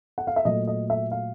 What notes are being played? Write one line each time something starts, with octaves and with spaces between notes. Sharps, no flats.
F#5
F5
E5
A#2 F#3 A3 D#5
D#5
E5
F5